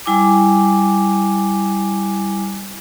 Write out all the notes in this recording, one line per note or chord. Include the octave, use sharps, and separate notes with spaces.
G3 E4 G#5 D6